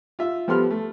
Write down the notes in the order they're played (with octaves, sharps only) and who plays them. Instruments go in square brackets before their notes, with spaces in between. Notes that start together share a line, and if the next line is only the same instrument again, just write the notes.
[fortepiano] F4 E5
F3 G3 B3 A4 C6 F6
A3